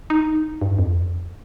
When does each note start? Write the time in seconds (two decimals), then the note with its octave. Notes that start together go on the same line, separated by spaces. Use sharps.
0.10 D#4
0.61 G2
0.79 F2